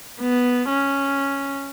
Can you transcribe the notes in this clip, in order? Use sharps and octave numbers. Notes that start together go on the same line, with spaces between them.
B3
C#4